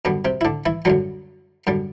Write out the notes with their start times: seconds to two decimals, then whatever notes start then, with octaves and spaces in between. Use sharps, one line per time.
0.05 F#2 D3 G3 B3
0.25 C3 C4
0.41 E4
0.45 D3 D4
0.66 E3 E4
0.85 F#2 D3 F#3 G3 F#4
1.67 F#2 D3 G3